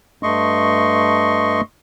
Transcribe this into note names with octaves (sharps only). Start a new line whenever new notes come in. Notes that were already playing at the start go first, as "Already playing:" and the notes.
G2 A3 D#5 C6 C#6